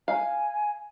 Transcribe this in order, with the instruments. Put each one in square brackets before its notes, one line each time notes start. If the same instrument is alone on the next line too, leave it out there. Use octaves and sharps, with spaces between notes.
[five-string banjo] F5 [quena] G#5